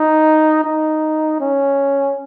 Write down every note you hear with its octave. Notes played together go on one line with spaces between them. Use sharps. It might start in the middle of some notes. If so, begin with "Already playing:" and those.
Already playing: D#4
D#4
C#4